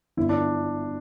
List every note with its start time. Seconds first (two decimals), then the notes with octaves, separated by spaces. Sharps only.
0.17 G1 E4
0.29 D4